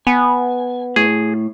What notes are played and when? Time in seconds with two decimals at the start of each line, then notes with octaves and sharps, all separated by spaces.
0.07 B3 G#5
0.96 A2 G#4